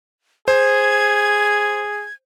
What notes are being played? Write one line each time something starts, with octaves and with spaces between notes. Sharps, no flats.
G#4 C5 G#6